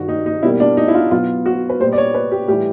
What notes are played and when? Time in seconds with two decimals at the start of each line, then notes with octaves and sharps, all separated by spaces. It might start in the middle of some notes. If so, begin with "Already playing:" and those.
Already playing: G2 D#3 G3 F#4
0.08 D#4
0.26 D#4
0.43 B2 G3 A#3 E4
0.60 D4
0.77 D#4
0.88 E4
0.94 F4
1.11 B2 F#3 B3 F4
1.46 F#4
1.69 B4
1.80 A#2 G3 B3 C5
1.93 D5
1.98 C#5
2.14 B4
2.31 G4
2.48 A2 E3 G3 G4